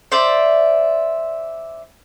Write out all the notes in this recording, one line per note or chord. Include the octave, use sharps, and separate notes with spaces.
C5 D5 E5